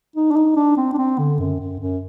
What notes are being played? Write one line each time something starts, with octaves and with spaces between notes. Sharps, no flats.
D#4
D4
D#4
D4
C4
D4
C4
D3
F#2
F#2
F#2